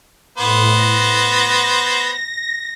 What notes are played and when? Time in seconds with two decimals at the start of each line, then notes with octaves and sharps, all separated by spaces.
0.38 A2 B3 C5
0.71 A#6